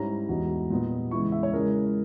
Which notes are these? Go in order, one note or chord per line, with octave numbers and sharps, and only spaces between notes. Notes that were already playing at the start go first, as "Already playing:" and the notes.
Already playing: G#2 G3 C#4 E4 A#5
E2 B2 G#3 D#4
A#2 G3 B3 D#4
E2 C#3 G#3 B3 E4 C#6
E5
C#5
C#3 G#3 C#4 E4 A#4